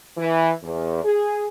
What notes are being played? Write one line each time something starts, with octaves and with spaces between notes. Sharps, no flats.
E3
E2
G#4